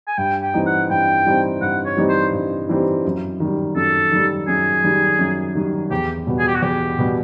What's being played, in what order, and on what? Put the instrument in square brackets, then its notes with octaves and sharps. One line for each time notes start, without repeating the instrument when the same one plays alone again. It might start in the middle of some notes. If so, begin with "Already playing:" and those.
[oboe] G#5
[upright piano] G2 [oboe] G5
[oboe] G5
[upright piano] E3 G3 C4 D#4
[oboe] F#5
[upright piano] G2 [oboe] G5
[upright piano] E3 G3 C4 D#4
[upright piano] G2 [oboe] F#5
[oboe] C#5
[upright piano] E3 G3 C4 D#4
[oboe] C5
[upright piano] G2
E3 G3 C4 D#4
F#2
D#3 G3
[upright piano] F#2 [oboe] A4
[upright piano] D#3 G3
[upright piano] F#2 [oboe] G#4
[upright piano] D#3 G3
F#2
D#3 G3
[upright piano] E2 [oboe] G4
[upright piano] B2 G3 B3
[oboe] G#4
G4
F#4
[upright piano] E2 [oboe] G4
[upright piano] B2 G3 B3